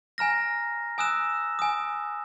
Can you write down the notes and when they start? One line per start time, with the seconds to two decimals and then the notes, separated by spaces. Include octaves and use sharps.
0.18 G#5 A#5 F6 A#6
0.98 G#5 D#6 E6 F#6 E7
1.59 G#5 D#6